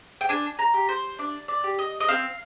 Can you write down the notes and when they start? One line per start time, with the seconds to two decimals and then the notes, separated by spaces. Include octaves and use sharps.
0.21 G5
0.29 D4 G#5
0.59 A#5
0.74 G4
0.89 C5
1.19 D4 D5
1.48 D5
1.64 G4
1.79 D#5
2.00 D#5
2.08 C4 F5